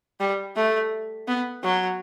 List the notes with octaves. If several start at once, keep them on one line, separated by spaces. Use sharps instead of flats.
G3
A3
B3
F#3